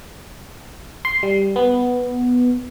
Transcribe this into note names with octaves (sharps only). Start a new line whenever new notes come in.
C6
G3
B3